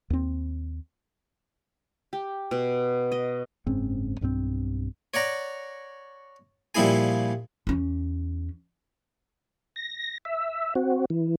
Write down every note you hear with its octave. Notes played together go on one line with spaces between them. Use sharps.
D#2 C4
G4
B2
D#5
F#1 G#2 C4 C#4
B1 G2 F3 C4
C#5 D5 F#5 A#5
A#2 F3 G3 E4 G#4 G#5
E2 C#4
A#6
E5
C4 F#4
E3